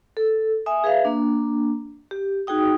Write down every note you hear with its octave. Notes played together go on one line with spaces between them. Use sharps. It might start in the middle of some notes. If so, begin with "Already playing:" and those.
A4
E5 G#5 D#6
G#4 B4 E5 F5
A#3 D4
G4
D#4 F#4 G#4 G5 D#6